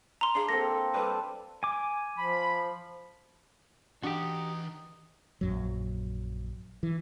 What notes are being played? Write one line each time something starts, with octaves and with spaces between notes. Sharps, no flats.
A#5 C6
D4 G#4 F5
A#3 C4 A4 A#6
G3 A4 B4
G#5 D6
F3 B5
E3 D4 D#4 F#4 G4 C6
A#1 F#2 F#3
E3